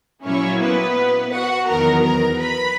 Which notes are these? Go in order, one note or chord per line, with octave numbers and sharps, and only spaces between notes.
A#2 F#3 A#3 C#4 E4 C#5
B3 B4
F#4 F#5
E2 D#3 F#3 B3 A#4 A#5
A#4 A#5
B4 B5